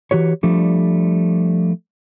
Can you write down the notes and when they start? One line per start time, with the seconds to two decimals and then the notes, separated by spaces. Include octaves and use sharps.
0.11 E3 F#4 G4 C#5
0.43 F3 G3 A3 D4